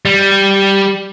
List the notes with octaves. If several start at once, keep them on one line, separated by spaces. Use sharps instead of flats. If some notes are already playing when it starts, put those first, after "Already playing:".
G3